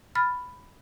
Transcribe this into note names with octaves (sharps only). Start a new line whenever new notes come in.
B5 F6 A6